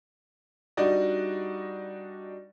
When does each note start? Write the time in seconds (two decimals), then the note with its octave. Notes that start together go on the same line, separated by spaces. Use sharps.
0.77 G3 D4 D#4 F#4 D5 D#5